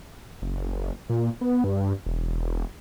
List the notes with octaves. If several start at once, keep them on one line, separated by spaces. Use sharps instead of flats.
F#1
A#2
B3
G2
E1